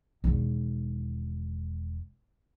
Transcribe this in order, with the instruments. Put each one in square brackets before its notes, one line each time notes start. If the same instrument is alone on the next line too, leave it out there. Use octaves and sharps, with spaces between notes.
[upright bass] E1 D#3